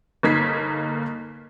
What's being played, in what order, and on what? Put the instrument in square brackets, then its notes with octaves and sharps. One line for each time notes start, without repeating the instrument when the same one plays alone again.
[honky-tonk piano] G1 A#3 D#4 G#6 B6 C7